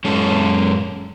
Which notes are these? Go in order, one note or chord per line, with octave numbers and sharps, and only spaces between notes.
F#2 G#3 C#4 A4